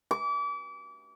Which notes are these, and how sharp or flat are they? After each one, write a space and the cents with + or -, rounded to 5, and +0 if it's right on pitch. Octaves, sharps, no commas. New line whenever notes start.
D6 -35